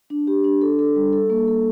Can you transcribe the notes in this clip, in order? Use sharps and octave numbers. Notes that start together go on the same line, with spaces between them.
D4
G4
D4
A4
A4
G3
A4
A#3
A4